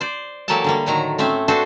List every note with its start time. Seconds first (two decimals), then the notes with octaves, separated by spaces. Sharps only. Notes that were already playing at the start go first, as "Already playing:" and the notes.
0.01 C5 D5
0.48 E3 F#3 A#3 G4 A4 A5
0.64 D3 G3 A#3
0.86 A2 D3 D#3 F#3 A#5
1.18 A3 C4 C#4 E5
1.48 D4 F#4 A4 B4 C5